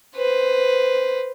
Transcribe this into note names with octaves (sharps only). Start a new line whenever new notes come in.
B4 C5